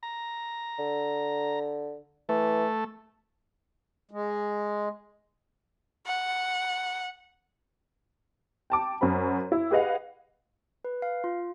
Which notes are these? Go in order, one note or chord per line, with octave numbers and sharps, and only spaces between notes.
A#5
D3
E3 A3
G#3
F#5
G5 A5 D6
F#2 F#4 C5 B5
E4
G4 G#4 B4 D#5 F5 F#5
B4
F5
F4